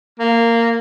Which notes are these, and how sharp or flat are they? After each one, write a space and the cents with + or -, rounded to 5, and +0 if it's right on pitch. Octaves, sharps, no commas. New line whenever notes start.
A#3 -10